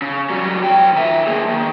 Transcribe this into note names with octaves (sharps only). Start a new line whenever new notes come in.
C#3
F#3 G3
F#2 G5
D#3 E5
A#3 G#4
D#3